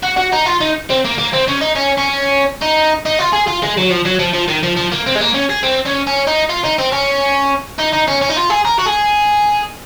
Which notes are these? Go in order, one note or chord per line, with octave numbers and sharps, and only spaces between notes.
F#4
F#4
D#4
F4
D#4
C4
A#3
A#3
C4
C#4
D#4
C#4
C#4
D#4
D#4
F4
G#4
F4
G#3
F#3
F3
F#3
F3
F3
D#3
F3
F3
A#3
C4
G#3
A#3
C#4
G#4
C4
C#4
C#4
D#4
F4
D#4
C4
C#4
D#4
D#4
C#4
C#4
D#4
F4
G#4
A#4
F#4
G#4